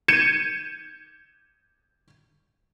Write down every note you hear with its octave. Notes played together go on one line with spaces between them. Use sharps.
G6 G#6 C#7 D#7 E7